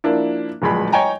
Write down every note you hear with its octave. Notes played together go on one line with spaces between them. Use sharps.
F3 A#3 D4 E4
D1 A#1 G#3 B5
C#5 D#5 G5 G#5 A#5